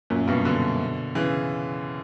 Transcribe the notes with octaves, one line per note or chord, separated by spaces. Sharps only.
F#2 A#2
G2 B2
B2 D3
C#3 E3